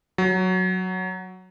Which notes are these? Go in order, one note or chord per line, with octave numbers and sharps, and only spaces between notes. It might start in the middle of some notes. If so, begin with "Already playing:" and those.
F#3